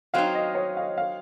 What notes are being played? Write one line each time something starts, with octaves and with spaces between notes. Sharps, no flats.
F#3 C4 D#4 F5
D#5
C#5
F5
F5